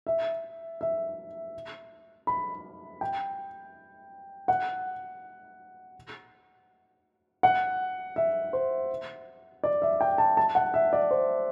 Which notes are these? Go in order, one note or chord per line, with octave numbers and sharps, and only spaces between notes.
E5
E5
B5
G5
F#5
F#5
E5
C5
D5
E5
G5
A5
A5
F#5
E5
D5
C5